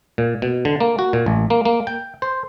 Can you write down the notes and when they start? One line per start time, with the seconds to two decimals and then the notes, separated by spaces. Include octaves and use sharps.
0.18 A#2
0.42 B2
0.65 D3
0.80 A#3
0.99 F#4
1.13 A#2
1.26 A1
1.50 A#3
1.65 A#3
1.87 G5
2.22 C5